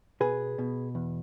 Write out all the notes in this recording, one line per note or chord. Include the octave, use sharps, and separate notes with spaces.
B2 G#4 B4
B2
E2